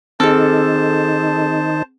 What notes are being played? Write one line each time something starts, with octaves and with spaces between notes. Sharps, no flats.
D#3 C4 D#4 G#4 A4 C5 A5